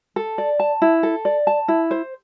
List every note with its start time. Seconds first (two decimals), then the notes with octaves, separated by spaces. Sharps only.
0.16 A4
0.38 D5
0.60 A5
0.82 E4
1.03 A4
1.25 D5
1.47 A5
1.68 E4
1.91 C5